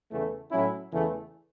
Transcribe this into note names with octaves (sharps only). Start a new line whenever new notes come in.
E2 C#3 E3 A3
A2 F#3 C#4 E4
E2 C#3 E3 A3